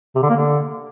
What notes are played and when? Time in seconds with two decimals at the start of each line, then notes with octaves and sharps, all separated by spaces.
0.15 C3
0.22 D3
0.29 A#3
0.36 D3